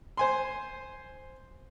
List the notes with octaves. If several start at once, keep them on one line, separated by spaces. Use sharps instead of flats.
C5 G#5 C6